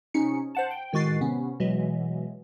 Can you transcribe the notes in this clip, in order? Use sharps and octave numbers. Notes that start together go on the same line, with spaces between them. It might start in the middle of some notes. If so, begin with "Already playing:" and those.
C3 C#4 D#4 C#7
C5 F#5 A5
G5
A2 D#3 G#3 F#4 A6 C7
C3 B3 C#4
B2 E3 F#3 G#3